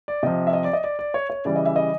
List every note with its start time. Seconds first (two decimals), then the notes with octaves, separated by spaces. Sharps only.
0.08 D5
0.23 C3 F3 D#5
0.47 E5
0.53 D#5
0.64 D5
0.73 D#5
0.84 D5
0.99 D5
1.14 C#5
1.30 C#5
1.45 C#3 E3 G3 D5
1.56 D#5
1.66 E5
1.76 D#5